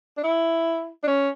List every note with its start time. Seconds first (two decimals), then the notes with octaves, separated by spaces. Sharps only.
0.17 D4
0.24 E4
1.03 D4
1.07 C#4